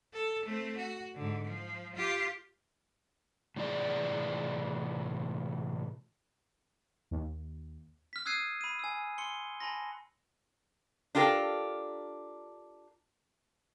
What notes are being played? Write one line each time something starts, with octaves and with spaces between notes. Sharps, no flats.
A4
A3 C4
F#4
G#2 D3
F3
F4 G4
A2 C3 E3 F4 G#4 D5
D#2
F6 B6
D#6 E6 F#6 G#6 C7 D#7
B5 D#7
G#5 E6
C6 C#7 G7
G#5 A5 B5 C6 A#6
D4 F4 G4 A4 A#4